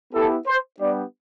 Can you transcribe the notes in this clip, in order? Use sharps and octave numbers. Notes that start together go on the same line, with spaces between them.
B3 E4 G4 A4
C5
G3 B3 D4 G4 D5